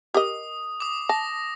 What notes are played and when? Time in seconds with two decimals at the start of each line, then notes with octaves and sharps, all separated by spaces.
0.14 G4 A#4 D#5 D#6
0.80 D6 D#6
1.09 A5 A#6